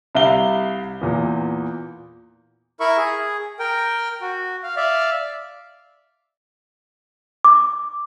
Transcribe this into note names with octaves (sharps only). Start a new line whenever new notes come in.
C2 E5 F5 G7
E2 A#2
E4 A#4 E5 B5 C#6
G#4
A#4 G5
F#4
F5
D5 E5 F5
D6